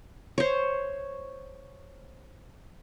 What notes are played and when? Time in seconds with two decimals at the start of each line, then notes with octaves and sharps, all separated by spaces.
0.38 C5 C#5